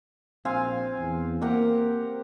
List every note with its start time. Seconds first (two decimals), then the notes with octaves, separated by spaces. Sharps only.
0.45 A#1 C4 F5 G#5
0.99 E2
1.41 A#3 G4 A#4 F#5